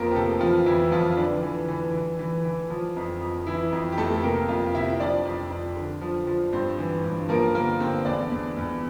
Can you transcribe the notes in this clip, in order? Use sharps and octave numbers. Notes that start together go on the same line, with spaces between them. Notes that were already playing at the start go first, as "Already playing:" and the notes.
Already playing: F2 F3 A#3 C4 A#4
G4
C3 A3 A4
E3 F3 F4
F2 E3 E4
F2 F3 F4
D3 E3 D4
E3
E3
E3
E3
E3
F3
F2
F2
E3 E4
F2
G4
F2 A3 A4
C3 A#3 A#4
F2 F4 F5
C3 E4 E5
F3 D4 D5
F2
F2
D3
F3
F3
G2 C4 C5
E3
G2
F3 A#3 A#4
D3 A#3 A#4
D3 C4 C5
E2 D4 D5
E2
E2